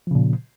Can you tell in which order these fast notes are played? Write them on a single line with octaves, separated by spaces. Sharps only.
F3 C#3 A#2